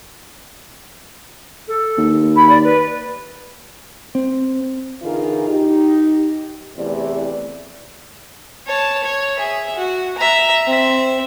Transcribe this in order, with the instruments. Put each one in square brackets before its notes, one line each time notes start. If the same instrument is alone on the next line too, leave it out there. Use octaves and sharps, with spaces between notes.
[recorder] A4
[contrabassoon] D#2
[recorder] B5
D5
B4
[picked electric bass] C4
[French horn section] D3 E3 D#4 F4 G#4 A#4
D#4 G4
E2 C3 E3 A3 D5
[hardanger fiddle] C#5 A5
C#5
G#4 E5
F#4
E5 A#5
C4 E5